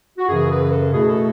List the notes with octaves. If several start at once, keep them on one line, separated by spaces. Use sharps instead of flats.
F#4
F#2 C#3 E3 G#4
B4
A4
B2 A3 E4 G#4
A4